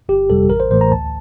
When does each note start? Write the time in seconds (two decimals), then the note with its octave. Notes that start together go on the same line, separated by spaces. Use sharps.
0.09 G1 G4
0.30 F2 C3 G3 A4
0.50 A1 A#4
0.60 C5
0.71 A2 E3 A3 C5
0.81 A#5
0.91 D2 A5